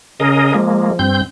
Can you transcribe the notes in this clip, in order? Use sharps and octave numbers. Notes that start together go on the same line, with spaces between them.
C#3 G#4 A#4 D#5
F3 G#3 A#3
G2 C4 G6